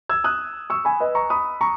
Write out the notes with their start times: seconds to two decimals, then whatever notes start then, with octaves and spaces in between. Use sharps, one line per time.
0.09 E6 G#6
0.24 D#6 F#6
0.70 C#6 E6
0.85 G#5 B5
1.00 B4 D#5
1.15 A#5 C#6
1.30 B5 D#6
1.61 A#5 C#6